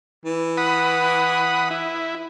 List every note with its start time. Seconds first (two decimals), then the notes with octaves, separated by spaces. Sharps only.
0.25 E3
0.57 F#5 B5 D#6
1.70 E4